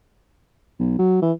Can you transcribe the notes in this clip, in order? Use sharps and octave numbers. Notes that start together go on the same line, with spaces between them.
B1
F#3
E3